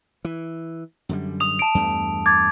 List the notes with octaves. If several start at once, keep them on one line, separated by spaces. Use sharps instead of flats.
E3
F#2 D3 G3
D#6 F7
A5 D7
E2 G2 A3
D6 G#6 A6